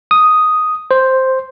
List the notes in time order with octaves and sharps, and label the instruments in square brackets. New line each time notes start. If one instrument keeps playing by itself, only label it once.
[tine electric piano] D#6
C5